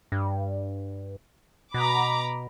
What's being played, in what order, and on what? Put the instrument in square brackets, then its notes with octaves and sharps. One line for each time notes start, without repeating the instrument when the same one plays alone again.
[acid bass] G2
[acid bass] B2 [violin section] A#5 B5 D6